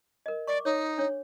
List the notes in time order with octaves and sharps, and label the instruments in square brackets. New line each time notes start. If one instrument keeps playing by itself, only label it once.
[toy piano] A#4 D#5
[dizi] D5 [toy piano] C#6 D6
[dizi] D#4 [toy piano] C#5
[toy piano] D4 C#5